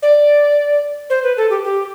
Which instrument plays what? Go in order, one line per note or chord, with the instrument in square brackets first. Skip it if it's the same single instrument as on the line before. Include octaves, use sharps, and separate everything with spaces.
[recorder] D5
C5
B4
A4
G4
G4